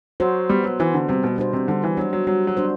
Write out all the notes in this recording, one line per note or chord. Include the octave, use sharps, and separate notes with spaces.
F#3 F#4 C5
G3 B3
F#3
E3 F#4 C5
D3
C3 G3
B2
B2 D4 F#4 C5
C3
D3 G3
E3
F#3 D4 F#4 C5
F#3
F#3 G3
F#3
D4 F#4 C5